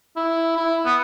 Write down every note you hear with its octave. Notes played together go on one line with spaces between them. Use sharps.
E4
E4
B3